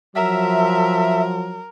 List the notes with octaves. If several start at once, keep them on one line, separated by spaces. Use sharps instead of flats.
F3 F#3 A#4 E5